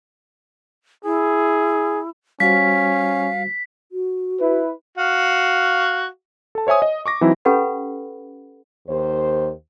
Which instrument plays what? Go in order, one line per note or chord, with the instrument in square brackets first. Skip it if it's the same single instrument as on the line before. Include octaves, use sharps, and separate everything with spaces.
[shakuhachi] E4 [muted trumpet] G#4
[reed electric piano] G3 F#4 C5 [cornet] C#4 [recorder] F5 [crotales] B6
[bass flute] F#4
[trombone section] E4 B4
[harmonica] F#4 F5
[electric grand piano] A4 A5
C5 C#5 E5 G#5 D#6
D#5
C#6 D6 A#6
E3 F#3 C4 D#4 E4
[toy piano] C#4 G4 A4 B4 F#5 B5
[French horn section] D#2 C5